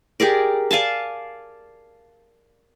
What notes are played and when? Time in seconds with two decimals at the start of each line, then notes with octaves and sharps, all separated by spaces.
0.20 G4 G#4 A#4 D5
0.71 D5 F5 G#5 A5